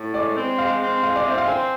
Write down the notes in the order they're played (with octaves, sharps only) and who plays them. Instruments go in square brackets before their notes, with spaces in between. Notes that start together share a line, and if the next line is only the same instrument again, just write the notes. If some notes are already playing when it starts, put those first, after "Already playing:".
Already playing: [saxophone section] A2
[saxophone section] G#3 [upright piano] D5
[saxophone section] C4
[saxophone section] G#3 [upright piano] F5
[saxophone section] C4
[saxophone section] G#3 [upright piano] F5
[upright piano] D5
[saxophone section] C4 [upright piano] E5
[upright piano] F5
[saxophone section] C4 [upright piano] G#5